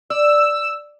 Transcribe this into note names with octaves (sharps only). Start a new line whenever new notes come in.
D5 E6